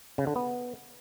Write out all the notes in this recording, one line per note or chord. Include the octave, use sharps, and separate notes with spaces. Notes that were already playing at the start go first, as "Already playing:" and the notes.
C#3
D3
B3